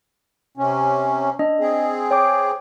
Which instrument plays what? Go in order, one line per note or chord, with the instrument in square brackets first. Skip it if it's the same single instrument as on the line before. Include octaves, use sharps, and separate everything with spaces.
[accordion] C3 C#4
[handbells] D4 D#5
[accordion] C4 G#4
[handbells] C#5 G5 D6